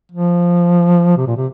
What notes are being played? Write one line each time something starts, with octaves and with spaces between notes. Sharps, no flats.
F3
C3
A#2
C3